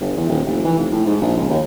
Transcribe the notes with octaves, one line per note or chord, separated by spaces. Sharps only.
G1
E2
D#1
F1
E3
F1
A2
G#2
A#1
C#2
D#2